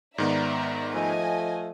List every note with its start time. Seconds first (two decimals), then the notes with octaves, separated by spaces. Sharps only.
0.18 G#2 D#3 B3 D5 E5 A#5
0.94 F3 A3 D#5 G#5